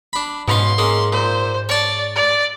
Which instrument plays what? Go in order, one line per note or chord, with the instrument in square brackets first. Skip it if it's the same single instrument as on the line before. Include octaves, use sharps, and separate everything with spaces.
[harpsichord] D4 B5
[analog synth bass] G#2 [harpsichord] B2 C#4 F5 [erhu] C6
[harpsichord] G#3 A#3 C#4
[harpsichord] A#2 [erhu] C5
[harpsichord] C#5 A5 [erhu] D5
[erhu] D5